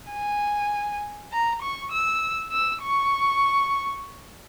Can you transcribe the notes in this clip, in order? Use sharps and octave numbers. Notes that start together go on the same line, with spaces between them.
G#5
A#5
C#6
E6
E6
C#6